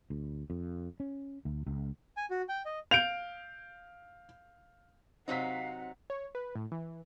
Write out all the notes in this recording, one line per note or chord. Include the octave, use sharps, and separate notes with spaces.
D2
F2
C#4
D2
C#2
G#5
F#4
G5
D#5
F5 G6 D7 F7
C3 F#3 C4 D#4 F5 F#5 B6
C#5
B4
A2
E3